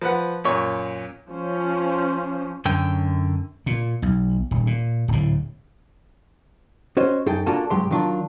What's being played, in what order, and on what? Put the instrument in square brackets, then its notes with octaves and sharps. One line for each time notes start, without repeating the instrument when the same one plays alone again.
[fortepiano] F3 B4 F#5
F#2 A#2 C#5
[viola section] F3 C#4 C5
[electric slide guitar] F#2 D3 C#4 G5
[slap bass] A#2
B1
D#1
A#2
D1 A2
[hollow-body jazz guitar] C#4 F#4 C5 C#5 D#5
F#2 D#4 G#4 A4 G5
A#3 D4 F4 F#4 A4 G#5
C2 G2 F#3 G#3 G4 C6
D#3 F#3 D4 F4